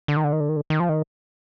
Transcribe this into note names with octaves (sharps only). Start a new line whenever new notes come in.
D3
D#3
D3
D#3
D3
D#3
D3
D#3
F3
D#3